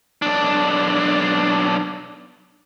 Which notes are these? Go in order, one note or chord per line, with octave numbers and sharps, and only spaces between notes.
B1 D4